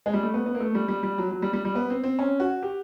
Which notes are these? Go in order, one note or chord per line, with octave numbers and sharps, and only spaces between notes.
G#3
G3
A3
B3
B3
A#3
A3
G3
G3
G3
F#3
F#3
G3
G3
G3
B3
C4
C4
C#4
F#4
G4